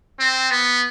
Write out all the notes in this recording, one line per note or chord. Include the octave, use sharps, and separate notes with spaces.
C4
B3